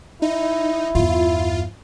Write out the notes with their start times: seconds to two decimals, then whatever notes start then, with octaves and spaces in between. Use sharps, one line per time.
0.22 D#4 E4
0.95 E2 G2 F4